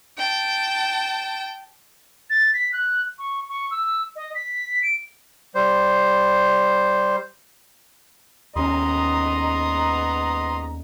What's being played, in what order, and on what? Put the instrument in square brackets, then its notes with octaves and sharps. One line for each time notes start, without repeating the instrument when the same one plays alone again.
[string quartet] G5 A5
[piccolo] A6
B6
F#6
C#6
C#6
E6
D#5
B6
D7
[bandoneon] G3 C5
[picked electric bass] D#2 C#4 [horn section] G#2 B3 A#5 [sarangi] D#5 [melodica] C6 D#6